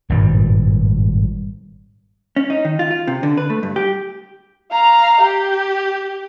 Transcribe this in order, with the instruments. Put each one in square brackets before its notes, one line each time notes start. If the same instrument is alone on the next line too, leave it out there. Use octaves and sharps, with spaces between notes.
[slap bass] G#1 G2 A#2 G3
[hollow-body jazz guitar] C#4
D#4
D#3
F4
F4
C3
D3
B4
A3
G2
G4
[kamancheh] F5 A#5
G4